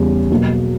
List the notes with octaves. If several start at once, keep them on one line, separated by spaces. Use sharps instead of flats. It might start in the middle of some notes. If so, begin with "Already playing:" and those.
Already playing: E2 C#3 G3 C#4
B2 F#3 A#3